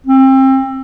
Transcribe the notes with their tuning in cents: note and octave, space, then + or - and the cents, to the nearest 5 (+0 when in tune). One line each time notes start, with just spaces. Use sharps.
C4 +30